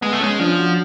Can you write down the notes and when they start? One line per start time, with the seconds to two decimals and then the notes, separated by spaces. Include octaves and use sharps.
0.01 G#3 B3
0.13 A3
0.20 G#3 C#4
0.39 F3 D4
0.57 F#4